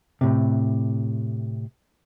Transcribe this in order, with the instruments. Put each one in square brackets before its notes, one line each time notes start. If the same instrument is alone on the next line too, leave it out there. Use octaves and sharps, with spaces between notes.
[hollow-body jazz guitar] A2 C3